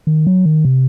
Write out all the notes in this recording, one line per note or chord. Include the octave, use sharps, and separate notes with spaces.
D#3
F#3
D#3
C3